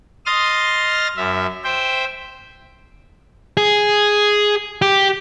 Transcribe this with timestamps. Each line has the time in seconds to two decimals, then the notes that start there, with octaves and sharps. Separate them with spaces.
0.26 D#5 C6 D#6 F6 A6
1.17 F#2 E5
1.64 C5 E5 G5
3.57 G#4
4.82 G4